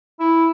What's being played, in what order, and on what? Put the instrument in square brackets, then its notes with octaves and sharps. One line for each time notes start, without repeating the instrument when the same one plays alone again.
[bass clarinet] E4